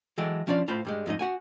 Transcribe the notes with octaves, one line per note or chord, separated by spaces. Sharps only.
E3 F#3 G#3 A4 G5
F3 C#4 D4 F4 D5
A2 F4 C5 B5
G2 G3 G#3
F2 G#2 D#4 D#5
F#4 F#5 G#5